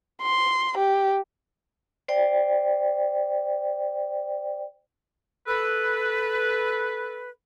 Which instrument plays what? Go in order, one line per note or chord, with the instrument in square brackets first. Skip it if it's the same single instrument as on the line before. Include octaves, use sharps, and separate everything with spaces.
[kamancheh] C6
G4
[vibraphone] C5 D5 G5
[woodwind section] A4 B4